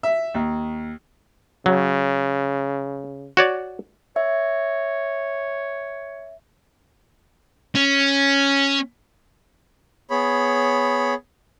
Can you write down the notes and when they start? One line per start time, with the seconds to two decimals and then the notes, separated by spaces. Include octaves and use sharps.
0.03 E5
0.34 D#2
1.66 C#3 F#3
3.37 F#4 C#5 D5
4.16 C#5 E5
7.75 C#4
10.10 B3 G#4 C#5 B5